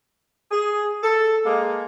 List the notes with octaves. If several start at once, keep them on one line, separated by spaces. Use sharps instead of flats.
G#4
A4
G#3 A#3